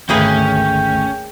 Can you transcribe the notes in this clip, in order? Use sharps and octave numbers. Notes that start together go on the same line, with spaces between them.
G#1 D2 A3 A#3 C#4 G#4 B4 G5